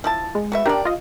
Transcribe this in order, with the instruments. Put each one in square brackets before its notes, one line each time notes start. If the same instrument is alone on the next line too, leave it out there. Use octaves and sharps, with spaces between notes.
[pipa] F3 E4 A5
[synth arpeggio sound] G#3
[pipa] F#4 B4 E5
[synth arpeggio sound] D4 G4 [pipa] A#4 D5
[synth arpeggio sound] F4 D#5